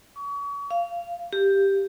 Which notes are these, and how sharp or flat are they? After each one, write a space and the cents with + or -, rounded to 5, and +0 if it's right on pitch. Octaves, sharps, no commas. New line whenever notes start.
C#6 +35
F5 -15
G4 +5